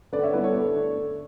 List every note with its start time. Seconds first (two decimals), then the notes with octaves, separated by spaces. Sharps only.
0.13 D3 B4 D5
0.19 F#5
0.23 C#5 E5
0.33 G3 B3 E4 B4 D5
0.44 A4 C#5
0.54 D3
0.75 A3 D4
0.96 D3